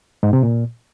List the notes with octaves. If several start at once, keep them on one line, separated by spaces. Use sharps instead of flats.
G#2
C3
A#2